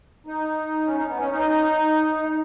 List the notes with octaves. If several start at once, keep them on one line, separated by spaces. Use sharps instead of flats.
D#4
C#4
D#4
B3
C#4
D#4